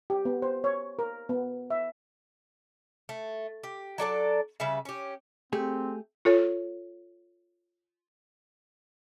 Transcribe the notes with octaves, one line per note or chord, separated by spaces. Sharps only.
G4
B3
C5
C#5
A#4
B3
E5
A3
G4
F#3 D4 A4 D5
C#3 G3 B4 E5
C#4 G4
A3 C4 G4 G#4
F4 A4 C#5